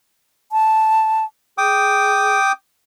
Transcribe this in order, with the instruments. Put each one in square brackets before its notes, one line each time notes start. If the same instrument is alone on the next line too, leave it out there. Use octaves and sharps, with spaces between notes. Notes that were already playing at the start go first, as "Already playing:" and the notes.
[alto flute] A5
[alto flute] G#4 [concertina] G5 D6 D#6